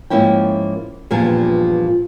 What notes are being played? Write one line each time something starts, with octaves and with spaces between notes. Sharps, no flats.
G#2 F3 A#3 C#4 E4 G5
E2 G2 A#2 F3 F4 G#5